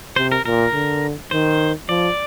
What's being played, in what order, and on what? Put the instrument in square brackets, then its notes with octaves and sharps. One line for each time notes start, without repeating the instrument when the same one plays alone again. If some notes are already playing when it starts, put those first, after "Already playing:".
[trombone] C3 [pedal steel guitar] C5
[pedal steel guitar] A#4
[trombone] A#2 [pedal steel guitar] A#4
[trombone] D3
[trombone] D#3 [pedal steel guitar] C5
[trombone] F3 [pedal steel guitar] D5